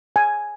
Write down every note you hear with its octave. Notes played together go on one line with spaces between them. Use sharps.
G#5